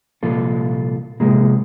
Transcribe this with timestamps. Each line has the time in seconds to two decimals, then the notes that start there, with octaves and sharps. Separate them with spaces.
0.23 C2 A#2 F3 F4 A4
1.20 A2 C3 F3 G#3 A#3